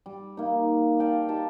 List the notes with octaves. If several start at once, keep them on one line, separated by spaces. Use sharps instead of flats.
G3
A#3 D#4
D5 F5 G5 A5
D#4 G4 A5